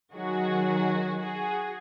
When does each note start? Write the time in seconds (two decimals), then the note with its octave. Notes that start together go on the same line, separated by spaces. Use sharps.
0.12 D#3 F#3 F#4 G#4
1.18 F#4 G#4